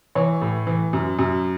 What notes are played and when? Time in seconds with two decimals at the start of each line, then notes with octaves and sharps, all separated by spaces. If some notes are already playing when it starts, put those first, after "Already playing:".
0.15 E3 C#5
0.42 A2
0.67 E3
0.93 F#2
1.19 F#2